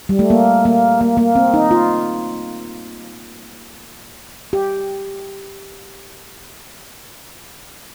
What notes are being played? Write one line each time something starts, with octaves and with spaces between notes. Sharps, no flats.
G3
A3
A#3
A#3
A#3
A#3
C4
D#4
F4
G4